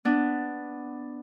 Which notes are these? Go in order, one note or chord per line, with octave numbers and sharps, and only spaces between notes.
B3 D4